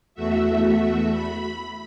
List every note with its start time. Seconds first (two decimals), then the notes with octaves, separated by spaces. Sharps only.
0.15 E2 A3 F#4 E5
1.11 B5